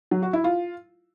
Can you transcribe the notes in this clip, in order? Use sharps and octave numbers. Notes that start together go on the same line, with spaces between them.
F#3
F#4
E4
F4